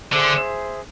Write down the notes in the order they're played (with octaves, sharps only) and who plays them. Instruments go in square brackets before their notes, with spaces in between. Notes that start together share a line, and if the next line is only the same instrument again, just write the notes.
[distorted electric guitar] D3 [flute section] G#4 C5 E5